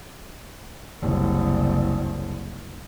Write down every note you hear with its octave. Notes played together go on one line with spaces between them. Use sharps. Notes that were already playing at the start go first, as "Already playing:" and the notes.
F#1 C2